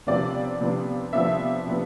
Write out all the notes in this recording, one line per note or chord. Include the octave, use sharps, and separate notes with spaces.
C3 F3 B3 D4 D5
C3 F3 B3 D4
C3 F3 B3 D4 E5
C3 F3 B3 D4